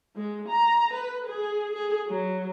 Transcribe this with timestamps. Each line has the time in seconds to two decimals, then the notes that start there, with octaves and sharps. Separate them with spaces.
0.15 G#3
0.48 A#5
0.93 B4
1.27 G#4
1.74 G#4
2.07 F#3